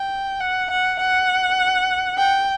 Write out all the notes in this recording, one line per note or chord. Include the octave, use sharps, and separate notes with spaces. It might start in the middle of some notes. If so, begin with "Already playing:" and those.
Already playing: G5
F#5
F#5
F#5
G5